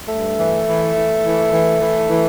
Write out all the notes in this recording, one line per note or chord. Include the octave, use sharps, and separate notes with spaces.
G2 A3
E3
E3
E3
E3
E3
E3
E3